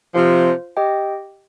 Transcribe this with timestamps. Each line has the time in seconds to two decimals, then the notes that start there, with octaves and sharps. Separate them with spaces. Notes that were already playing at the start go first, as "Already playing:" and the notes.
0.14 C3 F3 F4 C5 F5
0.77 G4 D#5 G5